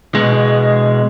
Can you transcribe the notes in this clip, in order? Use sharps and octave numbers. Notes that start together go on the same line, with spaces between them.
B2 G#3